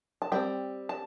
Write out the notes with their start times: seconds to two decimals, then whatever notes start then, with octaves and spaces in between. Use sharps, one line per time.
0.22 A5
0.32 G3 C4 G5
0.89 A5